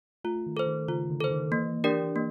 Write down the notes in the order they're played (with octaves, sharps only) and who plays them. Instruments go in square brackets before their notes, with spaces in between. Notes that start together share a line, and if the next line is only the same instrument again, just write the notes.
[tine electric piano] A3 [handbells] F4
[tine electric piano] D#3
[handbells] A4 C5
[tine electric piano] D#3
[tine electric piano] C#3 [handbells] F4
[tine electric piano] D3
[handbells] A4 C5
[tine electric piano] D#3
[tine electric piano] E3 [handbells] A#3
[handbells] D4 G4 A#4 D5
A#3